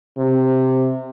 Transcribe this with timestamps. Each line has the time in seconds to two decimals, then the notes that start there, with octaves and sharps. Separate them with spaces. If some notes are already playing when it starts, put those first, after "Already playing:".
0.18 C3